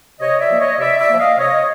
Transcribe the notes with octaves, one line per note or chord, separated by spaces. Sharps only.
C3 C#5 D#5
D5 E5
F3 A#3
C#5 D#5
C3 D5 E5
D5 E5
F3 A#3
D#5 F5
C3 C#5 D#5